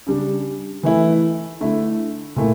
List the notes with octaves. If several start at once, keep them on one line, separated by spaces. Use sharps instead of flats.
C#3 G3 D4
E3 A3 E4
D3 A3 E4
A#2 A3 E4